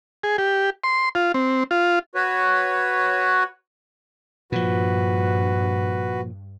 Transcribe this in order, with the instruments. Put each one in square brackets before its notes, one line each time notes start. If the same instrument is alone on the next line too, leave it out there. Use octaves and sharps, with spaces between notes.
[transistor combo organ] G#4
G4
C6
F4
C4
F4
[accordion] F#4 B4 C#5
[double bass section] G2 [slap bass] A#2 F3 [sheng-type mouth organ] F#4 B4